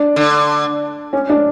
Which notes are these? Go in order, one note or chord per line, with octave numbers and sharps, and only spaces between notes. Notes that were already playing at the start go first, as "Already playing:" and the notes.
Already playing: D4
D3
C#4
D4